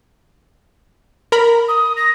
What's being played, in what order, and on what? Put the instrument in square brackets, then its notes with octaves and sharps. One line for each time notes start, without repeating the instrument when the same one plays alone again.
[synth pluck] A#4 A#5 B5
[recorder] D#6
A#6